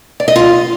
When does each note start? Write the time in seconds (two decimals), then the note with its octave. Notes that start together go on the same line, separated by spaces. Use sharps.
0.20 D5
0.28 D#5
0.36 F4